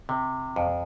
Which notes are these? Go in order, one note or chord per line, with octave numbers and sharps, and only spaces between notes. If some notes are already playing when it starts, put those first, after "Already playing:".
C3
F2